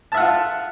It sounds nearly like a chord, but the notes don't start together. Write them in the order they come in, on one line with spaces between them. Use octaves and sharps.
A5 E5 F#5 F4